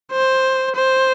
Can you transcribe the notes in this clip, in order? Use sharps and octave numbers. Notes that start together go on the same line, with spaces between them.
C5
C5